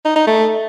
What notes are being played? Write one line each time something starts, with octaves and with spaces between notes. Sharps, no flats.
D#4
D#4
A3